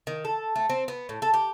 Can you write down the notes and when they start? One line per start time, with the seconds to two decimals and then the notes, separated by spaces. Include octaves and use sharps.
0.07 D#3
0.25 A4
0.56 A3
0.70 C4
0.88 B3
1.09 A2
1.22 A4
1.34 G4